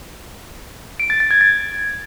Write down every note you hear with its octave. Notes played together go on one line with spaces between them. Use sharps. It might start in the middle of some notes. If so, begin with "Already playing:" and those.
D7
A6
A6
G#6
A6